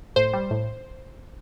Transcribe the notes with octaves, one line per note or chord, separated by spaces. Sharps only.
A2 C5
G3
A2